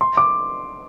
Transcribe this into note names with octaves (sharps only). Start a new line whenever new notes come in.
C6
D6